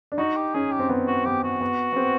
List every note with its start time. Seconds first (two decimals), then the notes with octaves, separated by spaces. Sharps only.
0.12 D4
0.18 D#4 F#4
0.36 G4
0.55 C#4 G#4
0.72 G4
0.79 C4
0.89 B3
1.08 F#4
1.25 B3 G4
1.44 F#4
1.61 B3
1.93 B3
1.96 C4